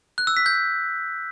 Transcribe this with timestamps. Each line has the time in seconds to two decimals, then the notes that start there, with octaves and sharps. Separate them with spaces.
0.18 F#6
0.27 E6
0.37 B6
0.46 G6